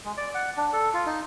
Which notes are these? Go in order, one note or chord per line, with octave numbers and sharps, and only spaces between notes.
G#3
D5
F#5
D4
A4
F4
D#4